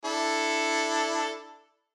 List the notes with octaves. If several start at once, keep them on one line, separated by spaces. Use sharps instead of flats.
D4 E4 A4